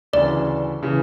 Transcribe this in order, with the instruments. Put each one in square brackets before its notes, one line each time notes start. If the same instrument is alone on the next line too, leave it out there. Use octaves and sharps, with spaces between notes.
[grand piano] D2 C#3 E3 [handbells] D5
[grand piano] C#3 E3